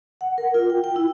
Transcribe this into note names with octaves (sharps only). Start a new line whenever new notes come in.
F#5
A#4
F4
G5
G5
E4